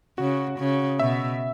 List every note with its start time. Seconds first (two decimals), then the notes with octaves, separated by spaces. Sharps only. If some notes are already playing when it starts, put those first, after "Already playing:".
0.18 C#3 F#4
0.59 C#3
0.99 B2 E5